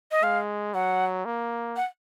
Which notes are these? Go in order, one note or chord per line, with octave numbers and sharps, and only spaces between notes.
D#5
G#3 F5
F#3 F#5
A#3
F#5